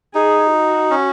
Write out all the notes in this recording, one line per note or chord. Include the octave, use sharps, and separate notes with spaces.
D#4 G#4
F#4
C#4